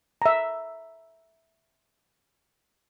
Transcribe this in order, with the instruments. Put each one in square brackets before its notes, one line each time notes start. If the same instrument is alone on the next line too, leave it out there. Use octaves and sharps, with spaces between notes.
[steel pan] E5 A#5